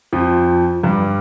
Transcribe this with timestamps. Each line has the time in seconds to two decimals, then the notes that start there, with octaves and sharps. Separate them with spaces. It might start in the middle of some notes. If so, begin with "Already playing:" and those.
0.13 F2 F3
0.83 G2 G3